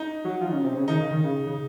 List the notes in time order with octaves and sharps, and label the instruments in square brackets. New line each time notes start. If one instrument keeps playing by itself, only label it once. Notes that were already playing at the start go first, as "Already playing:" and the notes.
Already playing: [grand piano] D#4
[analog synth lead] F#3
F3
D#3
C#3
C3
C#3
[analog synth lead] D#3 [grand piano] D#4
[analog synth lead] C#3
D#3
C#3
C#3